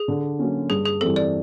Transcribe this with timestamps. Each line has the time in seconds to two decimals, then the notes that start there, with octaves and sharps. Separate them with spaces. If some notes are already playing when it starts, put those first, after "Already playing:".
Already playing: G#4
0.08 D3
0.39 F#3 A#3 C#4
0.70 G2 G#4
0.85 G#4
1.01 E3 G3 C4 A4
1.16 D5